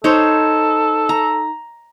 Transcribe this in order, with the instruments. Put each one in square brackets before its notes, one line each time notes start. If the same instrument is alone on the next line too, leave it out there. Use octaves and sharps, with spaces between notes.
[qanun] D#4 C5 C#5 [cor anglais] A4
[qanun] A#5